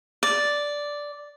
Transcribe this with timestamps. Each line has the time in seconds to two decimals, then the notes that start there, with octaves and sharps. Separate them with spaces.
0.23 D5